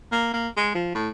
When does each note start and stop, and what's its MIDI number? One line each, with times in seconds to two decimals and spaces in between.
0.12 0.29 58
0.33 0.48 58
0.57 0.70 56
0.75 0.92 53
0.95 1.09 45